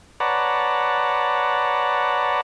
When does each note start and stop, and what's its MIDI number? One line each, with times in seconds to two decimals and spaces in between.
0.20 2.41 71
0.20 2.41 73
0.20 2.41 74
0.20 2.41 78
0.20 2.41 81
0.20 2.41 82